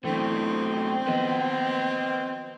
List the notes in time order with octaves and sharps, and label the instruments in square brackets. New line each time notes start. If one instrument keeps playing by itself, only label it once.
[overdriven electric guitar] B2 A3 [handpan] E3 F#3 D4 [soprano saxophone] C4
[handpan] D#3 F3 B3 [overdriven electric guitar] B4 D#5